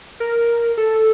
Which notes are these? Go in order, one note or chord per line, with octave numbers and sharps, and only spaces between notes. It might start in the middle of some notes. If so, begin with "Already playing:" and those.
A#4
A4